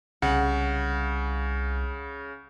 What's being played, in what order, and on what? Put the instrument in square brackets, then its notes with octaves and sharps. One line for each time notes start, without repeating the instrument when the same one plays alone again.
[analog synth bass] C2 [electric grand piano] C#3 [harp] F#5